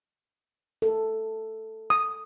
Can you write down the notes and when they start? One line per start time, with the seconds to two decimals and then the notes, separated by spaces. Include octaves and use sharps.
0.82 A4
1.90 D#6